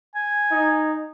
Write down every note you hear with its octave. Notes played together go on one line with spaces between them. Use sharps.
G#5
D#4